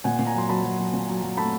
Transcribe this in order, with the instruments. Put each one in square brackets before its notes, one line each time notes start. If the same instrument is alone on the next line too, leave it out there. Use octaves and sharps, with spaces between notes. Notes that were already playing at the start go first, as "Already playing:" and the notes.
[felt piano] A#2 F#5 G#5
A#2
G#5 A#5
F#3 C6
F#3 A5 B5
F#3
F#3
A#2
F#3
F#3
A3 A5 B5